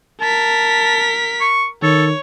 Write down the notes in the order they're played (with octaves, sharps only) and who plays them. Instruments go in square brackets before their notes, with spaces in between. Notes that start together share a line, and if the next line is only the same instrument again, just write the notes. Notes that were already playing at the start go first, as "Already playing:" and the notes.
[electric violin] A#4 B6 [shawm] A5
[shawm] C#6
[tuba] D#3 [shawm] A4 [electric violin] C#5